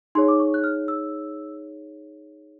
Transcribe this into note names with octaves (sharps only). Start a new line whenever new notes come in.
D#4 G#4 C#5 C6
D6
C#6
F#6
F6
E6